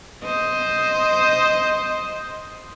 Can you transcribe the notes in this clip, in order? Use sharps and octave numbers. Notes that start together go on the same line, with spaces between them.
C5 D#5